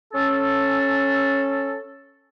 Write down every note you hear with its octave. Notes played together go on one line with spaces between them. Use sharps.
C#4 A4